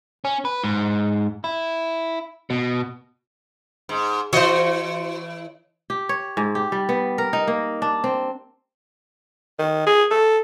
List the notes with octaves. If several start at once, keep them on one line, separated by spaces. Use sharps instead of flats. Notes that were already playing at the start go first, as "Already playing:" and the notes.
C#4
B4
G#2
E4
B2
G#2
E3 F#4 C5 C#5 D#5
G4
C#5
G#2
G4
G3
B3
A#4
D#4
A#3
D4
C4
D#3
G#4
A4